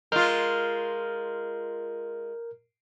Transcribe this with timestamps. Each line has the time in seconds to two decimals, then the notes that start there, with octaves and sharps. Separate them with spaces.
0.12 G#3 F4 A#4 F6 G6